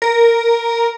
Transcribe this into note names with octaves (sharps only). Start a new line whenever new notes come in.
A#4